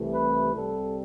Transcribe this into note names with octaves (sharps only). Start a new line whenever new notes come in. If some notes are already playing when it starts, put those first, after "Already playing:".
Already playing: C2 C3 E3 A3
B4
C2 C3 G3 A4